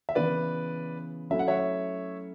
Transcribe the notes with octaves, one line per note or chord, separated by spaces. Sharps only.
E5
C#3 E3 B3 B4 D5
F#3 A3 C#4 E4 E5
F#5
C#5 E5